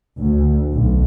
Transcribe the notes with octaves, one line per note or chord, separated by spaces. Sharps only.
D2
B1